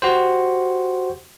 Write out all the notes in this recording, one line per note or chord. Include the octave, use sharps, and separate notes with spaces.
F#4 G4 C5